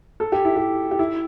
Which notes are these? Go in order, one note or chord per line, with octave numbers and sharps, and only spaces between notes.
A4
G4
E4
G4
G4
E4